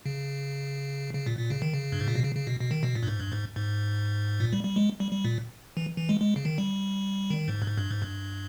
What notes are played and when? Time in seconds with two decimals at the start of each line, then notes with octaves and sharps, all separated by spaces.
0.06 C#3
1.14 C#3
1.26 A#2
1.39 A#2
1.50 C#3
1.62 D#3
1.74 C#3
1.92 G2
2.00 G#2
2.08 A#2
2.16 B2
2.24 C#3
2.35 C#3
2.47 B2
2.60 B2
2.71 D#3
2.83 B2
2.95 A#2
3.03 G2
3.07 G#2
3.20 G2
3.32 G#2
3.56 G#2
4.40 A#2
4.53 G3
4.64 G3
4.76 G#3
5.00 G3
5.12 G3
5.25 A#2
5.77 E3
5.97 E3
6.09 G#3
6.21 G#3
6.36 C#3
6.45 D#3
6.58 G3
7.30 D#3
7.48 G#2
7.62 G2
7.66 G#2
7.78 G2
7.91 G#2
8.02 G2